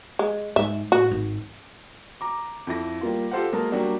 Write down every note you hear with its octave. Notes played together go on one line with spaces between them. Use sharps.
G#3
G#2 E5
A2 F#4
G#1
A#5 D6
F2 E4 A#6
G3 A#3 F4
F4 G4 A4 C5 F5 F#5
F#3 G#3 A#3 A#4 A5
F#3 G3 A#3 D4 F#4